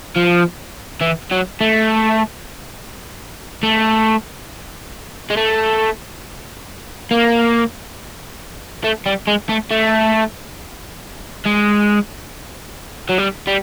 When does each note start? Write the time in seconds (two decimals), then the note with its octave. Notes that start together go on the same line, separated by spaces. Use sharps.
0.16 F3
1.01 E3
1.32 F#3
1.61 A3
3.63 A3
5.30 G#3
5.37 A3
7.11 A#3
8.84 A3
9.06 G3
9.28 G#3
9.50 A3
9.71 A3
11.45 G#3
13.09 F#3
13.18 G3
13.47 G3